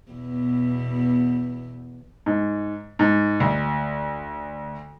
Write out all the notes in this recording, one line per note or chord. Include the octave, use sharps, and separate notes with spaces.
E2 B2
G#2
G#2
D2